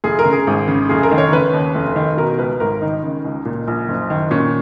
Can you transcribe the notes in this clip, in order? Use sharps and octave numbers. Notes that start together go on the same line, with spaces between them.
F1 G#4
A#4
C#3
G#4
G#1
C#3
F1 G#4
A#4
D#3
C#5
C#3 B4
D#2
F1
D#3
B2 A#4
C#2 B4
G#1 A#4
D#3 D#4
C#3
C#2
A#2
A#1
F#1
D#3
A#2 C#4